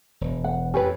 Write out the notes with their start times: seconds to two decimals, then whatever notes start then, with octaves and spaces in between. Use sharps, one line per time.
0.21 E1
0.44 F#5
0.74 F2 A2 C#4 G4 B4